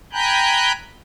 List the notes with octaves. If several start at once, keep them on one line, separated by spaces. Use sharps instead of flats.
G5 G#5 A#5 B5 F#6 G6